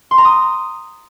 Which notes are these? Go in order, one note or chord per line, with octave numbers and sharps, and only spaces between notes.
C6
A#5
D#6